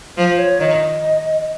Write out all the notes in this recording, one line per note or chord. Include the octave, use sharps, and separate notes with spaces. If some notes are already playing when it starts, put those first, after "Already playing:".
F3 C5
C#5
D#3 D#5